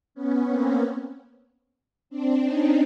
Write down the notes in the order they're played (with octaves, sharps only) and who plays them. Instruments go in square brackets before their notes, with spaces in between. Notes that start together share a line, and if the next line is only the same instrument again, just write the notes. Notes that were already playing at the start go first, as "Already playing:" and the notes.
[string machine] B3 C#4
A#3 C4
C4 D4
C#4 D#4